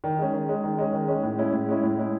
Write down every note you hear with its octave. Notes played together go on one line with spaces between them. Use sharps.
D#3
G#3 C#4
D#3
G#3 C#4
D#3
G#3 C#4
D#3
G#3 C#4
A2
G#3 C#4 E4
A2
G#3 C#4 E4
A2
G#3 C#4 E4